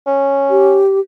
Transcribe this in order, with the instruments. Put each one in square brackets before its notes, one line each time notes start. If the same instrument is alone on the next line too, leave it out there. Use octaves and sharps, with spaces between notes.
[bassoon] C#4
[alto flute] G4